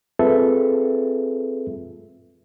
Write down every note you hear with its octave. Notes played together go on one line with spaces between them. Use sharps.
C4 F4 G#4 A4 B4 E5